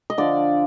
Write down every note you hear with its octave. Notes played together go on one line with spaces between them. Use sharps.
D#5
D3 F3 D5